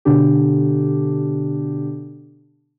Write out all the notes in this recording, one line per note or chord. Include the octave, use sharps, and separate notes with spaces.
B2 D3 D4 G4